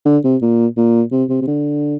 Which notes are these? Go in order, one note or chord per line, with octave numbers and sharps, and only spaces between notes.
D3
C3
A#2
A#2
C3
C3
C3
D3